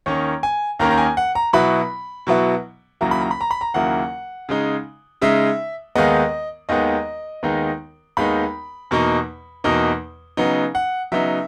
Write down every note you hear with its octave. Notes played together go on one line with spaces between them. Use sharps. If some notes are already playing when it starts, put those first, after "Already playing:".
D#2 D#3 A#3 C#4 C#5
G#5
D#2 D#3 A#3 C#4 A#5
A#5
G#5
F#5
A#5
B2 F#3 B3 E4 B5
B2 F#3 B3 E4
D#2 C#3 F#3 A#3 E4 A#5
B5
A#5
B5
A#5
B5
A#5
D#2 C#3 F#3 A#3 E4 F#5
C#3 G#3 D#4
C#3 G#3 D#4 E5
D#2 D#3 G#3 B3 D#5
D#2 D#3 G#3 B3 D#5
D#2 D#3 G#3 B3 D#4
D#2 D#3 G#3 B3 D#4 B5
E2 B2 A#3 D#4
E2 B2 A#3 D#4
C#3 F#3 B3 D#4
F#5
C#3 F#3 B3 D#4 E5